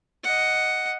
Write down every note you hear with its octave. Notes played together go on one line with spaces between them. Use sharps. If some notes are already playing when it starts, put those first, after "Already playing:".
D#5 F#5